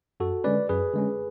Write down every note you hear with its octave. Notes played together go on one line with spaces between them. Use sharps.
F#2 F#4 A4
D3 G#3 C#4 B4 D5
F#2 G#4 B4
D3 G#3 C#4